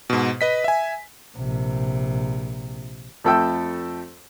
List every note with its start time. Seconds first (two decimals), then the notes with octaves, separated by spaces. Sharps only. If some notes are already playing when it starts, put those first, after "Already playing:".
0.10 G#2 B2
0.41 B4 D#5 B6
0.64 E5 G#5
1.37 A#1 C3
3.24 F2 A3 A4 E5 G5 E6